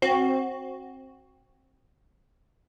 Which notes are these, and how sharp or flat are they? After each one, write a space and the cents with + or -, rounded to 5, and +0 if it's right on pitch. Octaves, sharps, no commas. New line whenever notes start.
C4 +15 F#4 +0